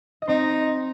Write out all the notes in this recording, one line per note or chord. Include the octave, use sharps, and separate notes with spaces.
D#5
C4 D#4 C5